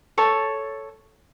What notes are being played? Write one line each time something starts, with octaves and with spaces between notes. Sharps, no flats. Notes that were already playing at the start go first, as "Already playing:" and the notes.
A4 C#5 A5